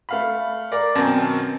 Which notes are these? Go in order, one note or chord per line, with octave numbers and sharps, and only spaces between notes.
A3 F5 B5
A#4 D5
F#2 B2 D#3 C4 A#4 A5